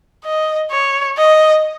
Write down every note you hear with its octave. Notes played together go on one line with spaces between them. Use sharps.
D#5
C#5
D#5